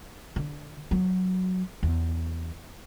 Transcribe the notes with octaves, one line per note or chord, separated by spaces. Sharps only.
D3
F#3
E2